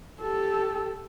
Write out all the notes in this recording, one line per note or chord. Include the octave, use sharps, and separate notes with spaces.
G4 A4